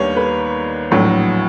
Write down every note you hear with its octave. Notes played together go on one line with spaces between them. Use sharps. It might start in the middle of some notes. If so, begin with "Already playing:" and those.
Already playing: D#2 D#3 G3 B3 D4 C#5
B4
A#1 A2 F#3